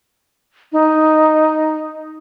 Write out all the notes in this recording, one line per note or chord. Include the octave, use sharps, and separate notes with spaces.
D#4